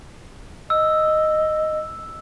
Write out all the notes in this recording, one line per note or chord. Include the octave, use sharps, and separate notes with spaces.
D#5 E6